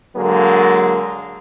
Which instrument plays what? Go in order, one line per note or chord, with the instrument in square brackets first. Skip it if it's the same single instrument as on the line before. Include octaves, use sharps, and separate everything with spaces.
[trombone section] D3 F#3 G#3 A#3